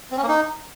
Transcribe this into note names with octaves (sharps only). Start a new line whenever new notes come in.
C4
C#4
A#3
D#4